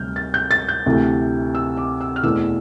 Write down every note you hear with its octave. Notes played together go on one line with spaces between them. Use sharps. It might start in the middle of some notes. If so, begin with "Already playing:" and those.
Already playing: D2 C3 G3 F6 G6
A6
G6
A6
G6
D2 C3 E3 A3
E6
D6
E6
F6
E2 B2 A3 E4 E6